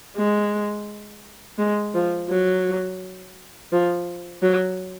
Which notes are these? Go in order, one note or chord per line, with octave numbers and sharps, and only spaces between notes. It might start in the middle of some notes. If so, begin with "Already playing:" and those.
G#3
G#3
F3
F#3
F3
F#3